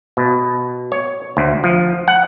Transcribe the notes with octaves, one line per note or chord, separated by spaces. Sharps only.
B2
C#5
D2
F3
F#5